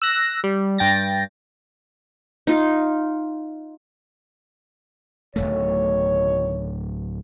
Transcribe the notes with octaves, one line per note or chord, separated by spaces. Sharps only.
E6 F#6 A#6
G3
G2 G5 A6 A#6
D#4 F4
D1 B1 B2 D#3 A3 C#5